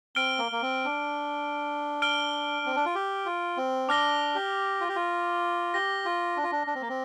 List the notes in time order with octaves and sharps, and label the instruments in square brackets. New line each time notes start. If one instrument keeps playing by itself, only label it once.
[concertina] C4 [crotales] F6 D7 G7
[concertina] A#3
A#3
C4
D4
[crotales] F6 D7 G7
[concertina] C4
D4
F4
G4
F4
C4
[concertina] D4 [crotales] D6 F6 A#6 G7
[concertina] G4
F4
G4
F4
[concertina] G4 [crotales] A#6 G7
[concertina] F4
D4
F4
D4
D4
C4
A#3
C4